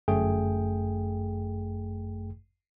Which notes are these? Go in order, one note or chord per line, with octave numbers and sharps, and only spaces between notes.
G1 F#2 A3 G#4 G5